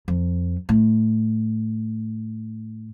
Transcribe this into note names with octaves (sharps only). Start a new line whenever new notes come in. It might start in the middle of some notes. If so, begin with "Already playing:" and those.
F2
A2